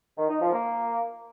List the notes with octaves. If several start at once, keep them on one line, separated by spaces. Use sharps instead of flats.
D#3
D#4
F3
A#3